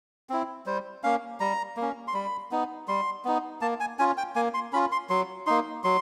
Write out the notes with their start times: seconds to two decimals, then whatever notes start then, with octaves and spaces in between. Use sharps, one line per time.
0.29 C4 E4
0.66 G3 C5
1.03 A#3 C#4 F5
1.40 G3 A#5
1.77 A#3
1.82 C#4
2.08 C6
2.14 G3 B5
2.51 B3 D#4
2.88 G3 C6
3.25 B3 D#4
3.61 A#3 A5
3.80 G#5
3.99 C#4 F4 G#5
4.17 G5
4.36 A#3 G#5
4.54 C6
4.73 C#4 F4 B5
4.92 C6
5.10 F#3 C6
5.47 A#3 D#4 C6
5.84 F#3 C6